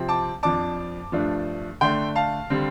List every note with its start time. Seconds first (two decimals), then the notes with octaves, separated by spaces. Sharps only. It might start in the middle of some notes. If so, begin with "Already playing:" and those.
Already playing: C3 F3 C4
0.09 A5 D6
0.43 F2 F3 D4 A5 D6
1.12 G2 F3 A3 D4
1.81 D3 A3 D4 G5 C6
2.15 F5 A5
2.50 D3 G3 C4